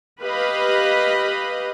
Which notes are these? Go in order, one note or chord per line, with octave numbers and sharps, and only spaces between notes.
G4 B4 D#5 F5 B5